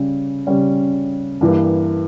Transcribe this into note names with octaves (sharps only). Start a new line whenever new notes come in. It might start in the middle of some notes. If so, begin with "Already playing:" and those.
Already playing: C#3 G3 C#4
C#3 G3 C#4
G2 E3 A#3